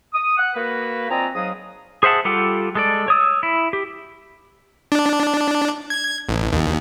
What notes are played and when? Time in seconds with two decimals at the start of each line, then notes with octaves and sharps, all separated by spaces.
0.13 D#6
0.38 F#5
0.55 A#3 F#4 B4
1.10 F3 C4 D5 D#5 G#5 A#5
1.35 G#2 F#3 F5 D#6
2.03 G#4 C5 E5 F#5 A5
2.25 G3 F4 G4 A4 F#5
2.75 G#3 A4 D5
3.08 C#5 D#6 E6
3.43 E4
3.73 G4
4.92 D4
5.90 G#6
6.29 A1
6.53 D#2